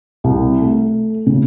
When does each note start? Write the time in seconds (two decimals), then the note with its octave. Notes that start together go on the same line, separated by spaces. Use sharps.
0.24 C2
0.61 A3
1.27 C#3